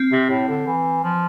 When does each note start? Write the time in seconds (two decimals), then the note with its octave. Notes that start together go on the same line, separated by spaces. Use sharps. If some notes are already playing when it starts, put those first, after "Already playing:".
Already playing: C4
0.12 C3
0.30 A2
0.48 D3
0.67 E3
1.04 F3